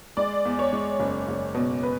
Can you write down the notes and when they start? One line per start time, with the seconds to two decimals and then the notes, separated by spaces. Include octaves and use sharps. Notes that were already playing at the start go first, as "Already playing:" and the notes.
0.17 G#3 D5
0.45 E2
0.59 C#5
0.73 G#3
1.00 F#1
1.28 F#1
1.55 B2
1.83 B4